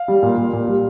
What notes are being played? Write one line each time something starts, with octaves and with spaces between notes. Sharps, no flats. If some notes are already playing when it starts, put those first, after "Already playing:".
Already playing: F5
G3
A#2
A#2
A#2
G3